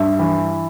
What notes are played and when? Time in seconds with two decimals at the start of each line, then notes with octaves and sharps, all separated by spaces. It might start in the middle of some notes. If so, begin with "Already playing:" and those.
Already playing: G2 E5
0.19 E3